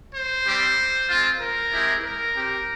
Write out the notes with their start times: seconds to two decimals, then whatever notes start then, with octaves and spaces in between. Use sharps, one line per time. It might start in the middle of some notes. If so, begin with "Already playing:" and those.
0.14 C5
0.46 G3 C4 G4
1.09 G#3 C4 F4
1.41 A#4
1.73 G#3 C4 E4 G4
2.04 A#4
2.36 C4 G4